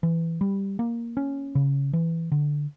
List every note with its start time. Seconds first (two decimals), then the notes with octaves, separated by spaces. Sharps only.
0.03 E3
0.41 G3
0.79 A#3
1.17 C#4
1.55 C#3
1.93 E3
2.32 D3